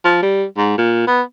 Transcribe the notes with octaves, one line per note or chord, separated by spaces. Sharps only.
F3
G3
G#2
A#2
B3